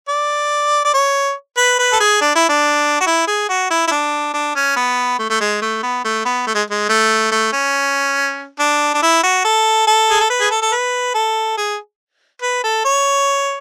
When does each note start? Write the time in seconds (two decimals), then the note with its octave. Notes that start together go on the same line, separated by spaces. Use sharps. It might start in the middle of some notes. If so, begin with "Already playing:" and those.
0.09 D5
0.85 D5
0.94 C#5
1.57 B4
1.79 B4
1.92 A4
2.00 G#4
2.21 D4
2.35 E4
2.49 D4
3.00 F#4
3.06 E4
3.27 G#4
3.49 F#4
3.70 E4
3.87 E4
3.91 D4
4.34 D4
4.55 C#4
4.76 B3
5.19 A3
5.30 A3
5.40 G#3
5.62 A3
5.83 B3
6.04 A3
6.25 B3
6.47 A3
6.54 G#3
6.70 G#3
6.89 A3
7.32 A3
7.53 C#4
8.59 D4
8.94 D4
9.02 E4
9.23 F#4
9.45 A4
9.87 A4
10.11 G#4
10.20 A4
10.30 B4
10.41 G#4
10.51 A4
10.62 A4
10.72 B4
11.14 A4
11.57 G#4
12.42 B4
12.63 A4
12.85 C#5